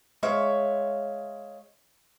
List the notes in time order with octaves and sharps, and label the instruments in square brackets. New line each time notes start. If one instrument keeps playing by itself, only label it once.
[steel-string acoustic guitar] G#3 C#5 E5 F5